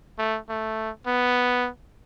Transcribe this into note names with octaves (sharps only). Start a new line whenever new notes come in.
A3
A3
B3